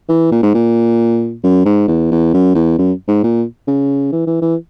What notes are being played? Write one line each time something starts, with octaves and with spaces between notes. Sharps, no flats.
E3
A#2
G#2
A#2
F#2
G#2
E2
E2
F#2
E2
F#2
G#2
A#2
C#3
E3
E3
E3